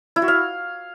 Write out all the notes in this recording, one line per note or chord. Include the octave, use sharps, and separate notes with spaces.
E4
F#4
F5